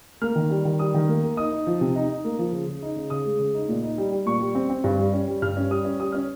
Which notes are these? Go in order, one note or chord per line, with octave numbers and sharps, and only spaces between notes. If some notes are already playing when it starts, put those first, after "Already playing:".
A#3 F6
D#3
G3
D#3
G3 D#6
D#3
A#3
A#3
D#4 D#6
D#4
F3
C3
D#4
D#4
A#3
F3
C#3
C#3
D#4
C#3
C#3 D#6
G#3
C#3
D#4
A#2
D#4
G3
G3
A#2 C#6
G3
C4
C4
G2
G3
C#4
G3
G2 F6
C#4
G3 D#6
C#4
G3 D#6
C#4 F6